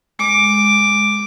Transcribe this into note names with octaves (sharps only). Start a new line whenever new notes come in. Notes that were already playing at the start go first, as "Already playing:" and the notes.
G#3 D6